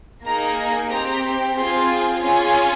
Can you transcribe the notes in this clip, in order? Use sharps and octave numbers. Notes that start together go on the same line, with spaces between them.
A#3 D#4 G#4 A#5
C4 G4 A#5
C4 F4 G#4 C6
C#4 F4 G#4